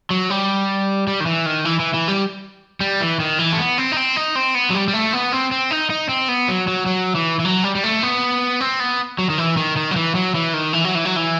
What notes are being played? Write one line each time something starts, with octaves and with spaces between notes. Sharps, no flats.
F#3
G3
G3
D#3
E3
D#3
E3
E3
E3
G3
G3
E3
D#3
E3
A3
B3
C4
D#4
C4
D#4
C4
B3
F#3
G3
G3
A3
B3
C4
C4
D#4
D#4
C4
B3
F#3
F#3
F#3
E3
E3
F#3
G3
G3
A3
B3
C4
B3
F#3
D#3
E3
D#3
D#3
F#3
E3
F#3
E3
D#3
E3
F#3
E3
F#3
E3